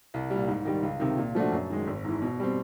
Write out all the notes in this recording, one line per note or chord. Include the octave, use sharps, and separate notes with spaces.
C2
A#2 G3
G#2
D#3 G3
C#2
C3 D#3
A#2
F3 A3 D4 F#4
F#2
D#3 G#3
G#1
G#2 E3
B2
G3 C4